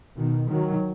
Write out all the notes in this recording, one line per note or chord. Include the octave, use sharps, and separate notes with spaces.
B2 D#3
D#3 F#3